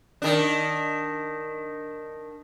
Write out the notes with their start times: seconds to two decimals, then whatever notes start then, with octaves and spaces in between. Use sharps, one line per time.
0.22 D#3 D4